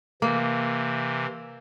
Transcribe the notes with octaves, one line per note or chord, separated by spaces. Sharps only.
C3 E3 A#3